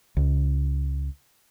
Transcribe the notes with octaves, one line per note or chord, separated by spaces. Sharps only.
C#2